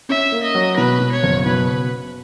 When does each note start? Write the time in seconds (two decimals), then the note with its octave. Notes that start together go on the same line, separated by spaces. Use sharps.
0.09 C#4 E5
0.32 A#3
0.43 D#5
0.55 F#3
0.77 B2 B4
1.00 B2
1.12 C#5
1.23 F#1
1.45 B2 B4